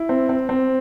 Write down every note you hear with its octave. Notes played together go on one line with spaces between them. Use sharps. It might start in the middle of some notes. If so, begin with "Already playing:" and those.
Already playing: E4
C4
C4
C4